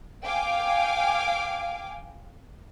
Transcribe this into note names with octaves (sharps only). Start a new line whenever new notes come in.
F5 G5 G#5 D6